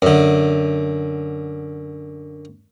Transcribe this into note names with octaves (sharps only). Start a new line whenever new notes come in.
F#2 D3